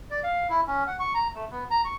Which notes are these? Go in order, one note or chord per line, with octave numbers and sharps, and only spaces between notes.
D5
F5
E4
C#4
F#5
C#6
A#5
A3
B3
A#5
C#6